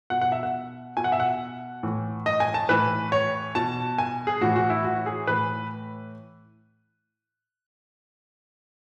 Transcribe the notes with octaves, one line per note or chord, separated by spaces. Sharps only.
B2 F#5
F#5
E5
F#5
B2 G#5
F#5
E5
F#5
A2 E3
D#5
G#5
A5
A2 E3 B4
C#5
B2 A5
G#5
G#4
A2 E3 F#4
F#4
E4
F#4
G#4
A2 E3 B4